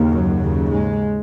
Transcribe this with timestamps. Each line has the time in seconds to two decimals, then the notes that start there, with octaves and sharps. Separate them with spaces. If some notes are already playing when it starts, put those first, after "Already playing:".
Already playing: D#2 C#3
0.10 F#2 F#3
0.41 D#2 C#3
0.70 G#2 G#3